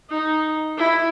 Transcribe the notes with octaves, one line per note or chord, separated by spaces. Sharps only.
D#4
E4